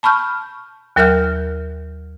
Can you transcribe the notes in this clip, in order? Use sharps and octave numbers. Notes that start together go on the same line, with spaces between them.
A5 B5 C#6 F6 G6
D#2 F#3 A#4 E5 F6 G6